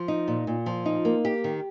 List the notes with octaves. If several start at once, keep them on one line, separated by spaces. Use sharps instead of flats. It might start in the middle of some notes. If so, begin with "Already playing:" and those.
Already playing: F3
D#4
A#2
A#2
F3
D#4
A#3
G4
D#3